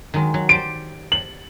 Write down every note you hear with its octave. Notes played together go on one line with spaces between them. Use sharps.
D#3 F#3 G#3
F#3
G4 C5 D5 D7
F#7